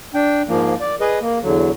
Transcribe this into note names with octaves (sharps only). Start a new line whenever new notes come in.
D4 G5
G#2 F3 A#3
D5
G#4 B4 D#5
A#3
E2 D3 F#3